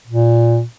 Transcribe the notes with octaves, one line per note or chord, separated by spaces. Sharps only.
A#2